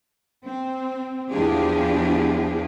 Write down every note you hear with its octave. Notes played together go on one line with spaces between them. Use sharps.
C4
E2 F3 D4 F4 G4 G#4